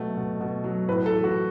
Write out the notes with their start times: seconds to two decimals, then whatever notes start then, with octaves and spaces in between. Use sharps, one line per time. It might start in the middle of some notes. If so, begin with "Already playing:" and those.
Already playing: B2 F#3 A3
0.17 B2
0.40 B2
0.64 F#3
0.88 A2 B4
1.06 A4
1.12 E3
1.24 F#4